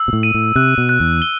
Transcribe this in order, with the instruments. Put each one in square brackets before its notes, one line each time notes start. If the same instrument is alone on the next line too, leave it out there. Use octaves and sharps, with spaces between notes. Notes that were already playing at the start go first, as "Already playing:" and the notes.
Already playing: [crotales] E6
[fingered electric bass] B2
A2
[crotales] D#7
[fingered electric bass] A2
[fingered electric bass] C3 [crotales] F#6
[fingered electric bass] B2
[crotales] F#6
[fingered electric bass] E2
[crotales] G7